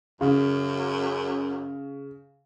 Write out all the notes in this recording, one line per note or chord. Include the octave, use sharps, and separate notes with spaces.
F#2 C#3